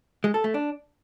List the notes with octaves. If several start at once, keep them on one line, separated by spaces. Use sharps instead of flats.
G#3
A4
A3
D4